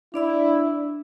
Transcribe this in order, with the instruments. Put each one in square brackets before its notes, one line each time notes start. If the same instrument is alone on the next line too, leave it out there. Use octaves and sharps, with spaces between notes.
[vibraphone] D4 D5 E6 [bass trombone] E4